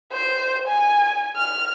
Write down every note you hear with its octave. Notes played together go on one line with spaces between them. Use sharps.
C5
G#5
F6